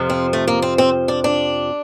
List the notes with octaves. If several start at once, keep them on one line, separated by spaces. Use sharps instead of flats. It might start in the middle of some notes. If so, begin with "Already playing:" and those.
Already playing: F2 C3 F3
C4
A3
A#3
C4
C4
D4
D4